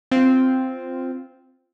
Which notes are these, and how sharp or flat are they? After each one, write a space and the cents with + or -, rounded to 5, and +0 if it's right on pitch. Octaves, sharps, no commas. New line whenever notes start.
C4 -5 F4 +0